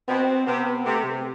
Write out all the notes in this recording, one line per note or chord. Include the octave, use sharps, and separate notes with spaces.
B2 C4
C3 B3
B3
C3 A3
C3